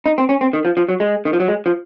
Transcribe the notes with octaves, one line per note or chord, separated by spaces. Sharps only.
D#4
C4
C#4
C4
D#3
F3
F3
F#3
G#3
D#3
F3
F#3
G#3
F3